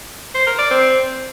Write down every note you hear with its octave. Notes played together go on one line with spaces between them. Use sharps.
C5
A#4
D5
C4